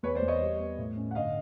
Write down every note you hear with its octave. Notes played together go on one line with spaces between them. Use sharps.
E2 B4 C#5
C5 D5
E2
C#5 D#5
G3
B3
A2
C#4
F#5
G1 D#5 F5